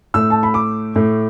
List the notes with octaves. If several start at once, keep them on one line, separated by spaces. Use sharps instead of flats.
A2 A3 E6
A5
B5
D6
A2 A3